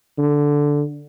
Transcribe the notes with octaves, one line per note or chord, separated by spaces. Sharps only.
D3